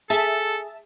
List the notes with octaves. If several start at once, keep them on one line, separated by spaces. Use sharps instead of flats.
G#4 A4 E5 A5